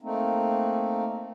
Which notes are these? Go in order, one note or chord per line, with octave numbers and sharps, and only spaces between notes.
A3 A#3 C4 D#4